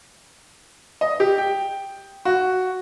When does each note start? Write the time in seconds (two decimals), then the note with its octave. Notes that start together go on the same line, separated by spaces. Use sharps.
1.01 D#5
1.20 G4
1.38 G5
2.25 F#4